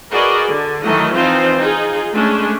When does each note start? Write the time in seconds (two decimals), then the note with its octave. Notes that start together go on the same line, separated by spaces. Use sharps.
0.10 F#4 G#4 A#4 B4 D5 D#5
0.48 D3
0.84 D#3 E3 F#3 A3 D#5
1.15 E3 F3 C4 D#4 F4 C5
1.57 D#4 F4 G#4
2.13 G#3 A3 C#4 D4